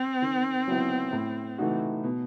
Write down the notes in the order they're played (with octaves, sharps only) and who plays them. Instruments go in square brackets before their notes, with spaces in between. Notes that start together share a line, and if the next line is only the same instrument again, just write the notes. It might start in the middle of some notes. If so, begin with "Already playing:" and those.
Already playing: [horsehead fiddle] C4
[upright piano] D#3
F#3 B3 E4
A2
E3 A3 D#4 F#4
B2